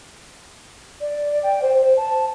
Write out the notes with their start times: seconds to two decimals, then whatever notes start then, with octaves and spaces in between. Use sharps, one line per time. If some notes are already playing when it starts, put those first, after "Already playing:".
1.01 D5
1.43 G5
1.62 C5
1.77 C5
1.97 A5